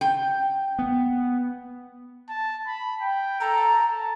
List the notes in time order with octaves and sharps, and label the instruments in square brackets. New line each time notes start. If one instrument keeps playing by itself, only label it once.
[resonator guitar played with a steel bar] G5
[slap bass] B3
[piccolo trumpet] A5
B5
G5
[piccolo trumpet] A4 [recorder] A#5
[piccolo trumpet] A5